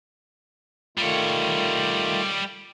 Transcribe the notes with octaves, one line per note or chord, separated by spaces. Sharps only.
D#3 G3 A3 F4 C#5